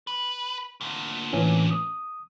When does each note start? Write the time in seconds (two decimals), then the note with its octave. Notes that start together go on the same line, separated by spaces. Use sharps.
0.07 B4
0.81 D2 A#2
1.33 A2 E3 C#4
1.71 D#6